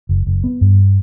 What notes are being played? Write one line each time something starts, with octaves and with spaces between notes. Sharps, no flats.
F#1
F#1
B3
G2